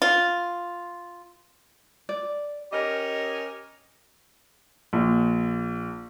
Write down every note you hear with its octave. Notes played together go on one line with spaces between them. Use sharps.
F4
D5
C#4 G4 A#4 D#5
A#1